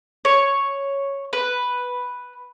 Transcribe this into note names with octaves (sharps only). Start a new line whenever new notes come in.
C#5
B4